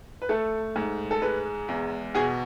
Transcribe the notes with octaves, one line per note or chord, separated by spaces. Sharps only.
B4
A3 A4
G#2
A4
G#3 B4
E2
B2 G#4